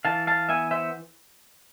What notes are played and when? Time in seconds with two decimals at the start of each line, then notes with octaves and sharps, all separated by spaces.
0.05 E3 F5 A5
0.27 F5 A5
0.49 B3 E5 G#5
0.71 C5 E5